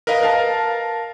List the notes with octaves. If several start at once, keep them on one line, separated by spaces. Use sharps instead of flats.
A#4 B4 D#5 F5
A#4 F5 A5